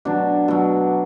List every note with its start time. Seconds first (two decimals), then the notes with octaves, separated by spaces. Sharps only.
0.05 B2 F#3 D4
0.48 B2 F#3